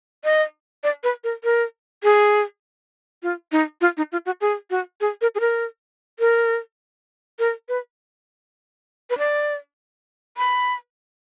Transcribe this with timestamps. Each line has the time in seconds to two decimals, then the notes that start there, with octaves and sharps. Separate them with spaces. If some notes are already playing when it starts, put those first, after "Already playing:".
0.24 D#5
0.84 D5
1.04 B4
1.24 A#4
1.44 A#4
2.04 G#4
3.23 F4
3.52 D#4
3.81 F4
3.97 D#4
4.12 F4
4.26 F#4
4.41 G#4
4.70 F#4
5.01 G#4
5.21 A#4
5.35 G#4
5.40 A#4
6.20 A#4
7.39 A#4
7.69 B4
9.10 B4
9.18 D5
10.38 B5